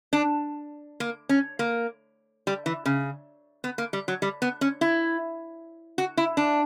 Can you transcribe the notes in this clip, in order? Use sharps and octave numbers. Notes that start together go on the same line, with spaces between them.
D4
A#3
C#4
A#3
G3
E3
C#3
B3
A#3
G3
F#3
G3
B3
C#4
E4
F#4
E4
D4